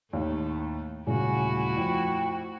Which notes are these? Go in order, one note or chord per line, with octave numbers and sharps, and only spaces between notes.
D#2 A2 A3
D#1 C#3 A3 E4 F#4 G#5
F2 G5